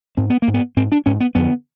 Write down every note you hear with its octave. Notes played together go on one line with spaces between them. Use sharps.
G#2 C4
B3
A#3
G#2
B3
G#2 C4
D4
G#2 C#4
B3
F2 D3 B3